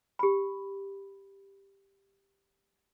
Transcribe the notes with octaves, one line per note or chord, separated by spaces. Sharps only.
G4 B5